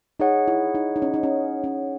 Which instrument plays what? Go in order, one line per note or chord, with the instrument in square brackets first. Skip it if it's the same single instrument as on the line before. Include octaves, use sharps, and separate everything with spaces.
[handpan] D#4 [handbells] G#4 C#5 F#5
[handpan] E4
D#4
D#4
C#4
D#4
C#4
C#4